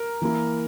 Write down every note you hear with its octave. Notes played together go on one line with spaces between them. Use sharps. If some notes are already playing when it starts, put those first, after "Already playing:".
Already playing: A#4
E3 A#3 E4